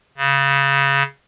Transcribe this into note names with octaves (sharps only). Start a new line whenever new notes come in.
C#3